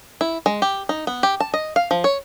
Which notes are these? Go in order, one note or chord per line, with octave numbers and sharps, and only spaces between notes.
E4
G#3
G4
D#4
B3
G4
A5
D#5
F5
F3
C#5